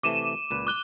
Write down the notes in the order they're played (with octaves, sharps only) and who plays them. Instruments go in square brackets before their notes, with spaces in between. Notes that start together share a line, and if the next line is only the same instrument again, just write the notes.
[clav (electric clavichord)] C3 E3 A3 [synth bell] D6 D#7 E7
[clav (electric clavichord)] C#2 A#2 B4
[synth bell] D6 F#6 G7